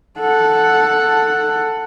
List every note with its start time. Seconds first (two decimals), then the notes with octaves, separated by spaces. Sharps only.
0.19 A4 F#5